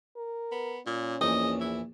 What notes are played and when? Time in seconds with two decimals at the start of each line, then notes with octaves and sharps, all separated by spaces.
0.17 A#4
0.52 B3
0.86 A#2 C#4
1.21 A#1 E2 D#5
1.60 E4